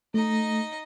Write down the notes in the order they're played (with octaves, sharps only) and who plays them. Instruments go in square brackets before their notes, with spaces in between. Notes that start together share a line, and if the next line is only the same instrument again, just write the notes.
[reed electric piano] A3 [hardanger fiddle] D#4 D#5